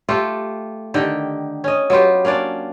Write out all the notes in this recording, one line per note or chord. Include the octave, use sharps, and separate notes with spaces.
A3 F4 G4
D3 D#3 G4 G5
C#4 D#5
F#3 B3 F4 G4
A#3 C#4 D4 D5